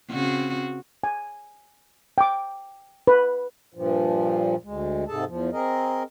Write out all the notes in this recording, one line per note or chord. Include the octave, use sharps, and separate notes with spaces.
C#3 C4 F#4
G#5
G5 D6
B4
G2 A#2 F3
D2 G#3
G#2 C3 G#4 A4 A5
E2 F3
C4 G#4 A#4 D#5